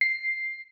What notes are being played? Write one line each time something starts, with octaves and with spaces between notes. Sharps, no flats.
C7